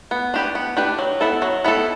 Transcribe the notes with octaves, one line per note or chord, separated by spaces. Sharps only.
B3
D4 G4 B4
B3
D4 G4 B4
F#3
B3 E4 A4
F#3
B3 E4 A4